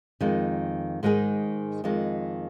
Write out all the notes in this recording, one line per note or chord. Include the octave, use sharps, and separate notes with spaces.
F2 D#3 G#3
G#2 D#3 G#3 D#4 G#4
F2 D#3 G#3